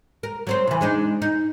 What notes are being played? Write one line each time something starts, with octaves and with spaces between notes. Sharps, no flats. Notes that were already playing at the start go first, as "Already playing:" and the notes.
A#4
F#3 C4 C5
C3 E3
G#3 D4 D#4
D#4